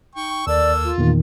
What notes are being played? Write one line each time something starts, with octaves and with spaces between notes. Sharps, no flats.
D#4 G5 C#6
D#2 A#3 A4 D5 E6
F4
E2 A#2 D#3